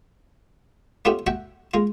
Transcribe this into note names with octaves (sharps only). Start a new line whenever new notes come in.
A3 B3 C#4 F4 G4 E5
F#4 E5 F#5 G5
G#3 F4